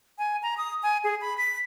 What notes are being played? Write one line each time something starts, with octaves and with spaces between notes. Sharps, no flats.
G#5
A#5
D#6
G#5
G#4
B5
B6